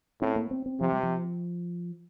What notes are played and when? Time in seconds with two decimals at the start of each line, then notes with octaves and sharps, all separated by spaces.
0.21 A2 C4
0.36 A#3
0.51 C4
0.66 C4
0.80 C3 F3
0.92 G3
1.03 F3